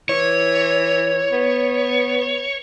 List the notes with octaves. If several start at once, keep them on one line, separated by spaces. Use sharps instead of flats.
E3 C#5
B3